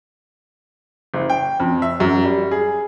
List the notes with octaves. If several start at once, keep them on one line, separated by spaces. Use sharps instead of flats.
F#1
G5
F2
E5
F#2
G3
G#4